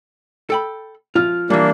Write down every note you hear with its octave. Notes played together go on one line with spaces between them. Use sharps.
A4 G5 B5
F3 F4 F6
E3 G3 A#3 D4